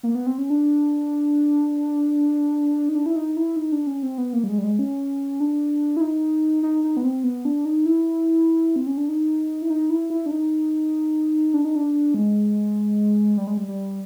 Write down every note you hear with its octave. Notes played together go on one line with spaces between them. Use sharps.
A#3
B3
C4
C#4
D4
D#4
D4
E4
D#4
E4
D#4
D4
C#4
C4
B3
A#3
G3
G#3
G3
G#3
C#4
D4
E4
D#4
D#4
D#4
B3
C4
B3
D4
D#4
E4
C4
C#4
D4
D#4
E4
D#4
E4
E4
D4
D#4
D4
D#4
D4
G#3
G3
G#3
G3
G3